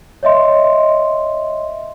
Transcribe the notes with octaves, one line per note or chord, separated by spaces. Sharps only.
C#5 D#5 E5 C6